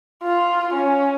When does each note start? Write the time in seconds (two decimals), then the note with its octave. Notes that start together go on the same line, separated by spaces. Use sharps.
0.23 F4
0.74 C#4